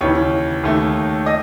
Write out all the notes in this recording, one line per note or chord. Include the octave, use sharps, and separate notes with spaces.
D#2 C#3 E3 C#5 C#6
D#2 D#3 A3
D#5 D#6